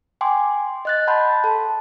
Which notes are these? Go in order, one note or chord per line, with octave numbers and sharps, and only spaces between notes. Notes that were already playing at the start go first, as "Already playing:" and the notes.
G5 G#5 C6 D6
D#5 F#6 A6
F#5 A5 B5 C6 G6
A4 A5